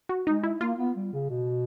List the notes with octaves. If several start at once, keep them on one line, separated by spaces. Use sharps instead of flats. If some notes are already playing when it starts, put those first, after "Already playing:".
F#4
G#3 D#4
E4
A#3 F4
B3
G3
C#3
B2